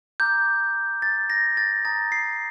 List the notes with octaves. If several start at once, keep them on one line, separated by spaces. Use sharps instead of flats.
A#5 D6 F6 G6
A6
A#6
A6
A#5 D#6 G6 A6
C7